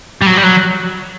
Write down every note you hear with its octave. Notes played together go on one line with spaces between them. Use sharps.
G3
F#3
G3
F#3